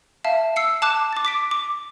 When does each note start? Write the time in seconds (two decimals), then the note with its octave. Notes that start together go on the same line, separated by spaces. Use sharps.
0.24 E5 F5 A5
0.56 E6 C7 C#7
0.82 A5 D6 F#6 E7
1.13 D6 A6
1.25 D6 B6 D7
1.51 D6